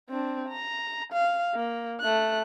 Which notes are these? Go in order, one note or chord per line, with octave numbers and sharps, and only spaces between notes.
C4 D4
A#5
F5
A#3
A3 F#6